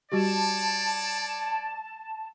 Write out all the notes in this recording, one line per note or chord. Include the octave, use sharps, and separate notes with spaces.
G3 F#4 G4 C#5 D5 A5